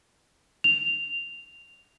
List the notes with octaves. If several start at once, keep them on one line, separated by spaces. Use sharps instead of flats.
F7